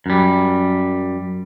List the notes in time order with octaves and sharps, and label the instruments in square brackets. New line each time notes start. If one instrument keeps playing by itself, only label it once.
[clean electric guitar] F#2 G3